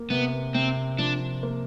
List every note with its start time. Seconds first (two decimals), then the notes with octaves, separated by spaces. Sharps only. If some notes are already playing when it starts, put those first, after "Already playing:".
Already playing: A#3
0.10 C3 B3
0.54 C3 C4
0.99 F3 D4
1.43 A#3